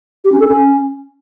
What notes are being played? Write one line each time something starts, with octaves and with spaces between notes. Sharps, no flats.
G4
C#4
A4
C#4